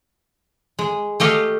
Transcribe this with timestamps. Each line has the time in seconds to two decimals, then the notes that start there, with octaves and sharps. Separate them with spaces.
0.79 G#3
1.20 A3 G4 D#5 F5